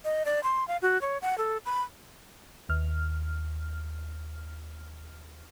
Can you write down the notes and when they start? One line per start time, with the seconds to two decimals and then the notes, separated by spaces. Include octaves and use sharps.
0.05 D#5
0.26 D5
0.43 C6
0.68 F5
0.82 F#4
1.01 C#5
1.22 F#5
1.38 A4
1.66 B5
2.69 D#2 F6